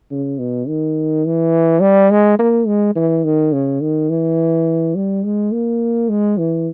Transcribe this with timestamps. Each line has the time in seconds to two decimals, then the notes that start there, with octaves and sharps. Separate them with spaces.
0.11 C#3
0.39 B2
0.68 D#3
1.25 E3
1.81 G3
2.11 G#3
2.39 A#3
2.67 G#3
2.95 E3
3.24 D#3
3.53 C#3
3.81 D#3
4.10 E3
4.96 G3
5.24 G#3
5.52 A#3
6.09 G#3
6.38 E3